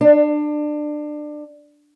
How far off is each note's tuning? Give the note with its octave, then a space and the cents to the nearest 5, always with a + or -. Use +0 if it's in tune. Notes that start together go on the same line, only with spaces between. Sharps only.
D4 +25